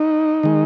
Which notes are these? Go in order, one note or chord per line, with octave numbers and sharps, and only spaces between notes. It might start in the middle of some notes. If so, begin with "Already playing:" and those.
Already playing: D#4
D#3 G#3